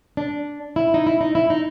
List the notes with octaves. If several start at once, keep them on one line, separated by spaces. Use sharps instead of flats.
D4
E4
D#4
E4
D#4
E4
D#4